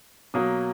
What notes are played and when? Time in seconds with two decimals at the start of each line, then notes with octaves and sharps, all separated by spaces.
0.34 B2 F#3 A#3 D#6